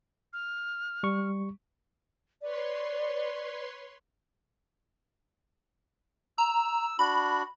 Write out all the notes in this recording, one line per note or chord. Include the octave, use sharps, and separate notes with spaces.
F6
G3 C#6
B4 C#5 D5 C6
A#5 E6
D4 F#4 B5